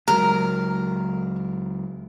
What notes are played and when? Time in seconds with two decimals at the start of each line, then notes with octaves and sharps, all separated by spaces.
0.08 C#2 F#3 G#3 A#4